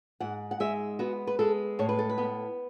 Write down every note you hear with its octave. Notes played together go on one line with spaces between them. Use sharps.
G#2 F#5
F#5
G#3 E5
B3 F#4
B4
G#3 A4
A2 C#5
B4
A4
B4
B3